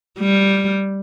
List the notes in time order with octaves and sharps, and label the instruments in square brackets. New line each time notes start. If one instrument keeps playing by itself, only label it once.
[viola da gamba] G3